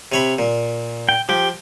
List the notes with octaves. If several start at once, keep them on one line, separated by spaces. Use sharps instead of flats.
C3 C#5 B5
A#2
G5
F3 G4 G5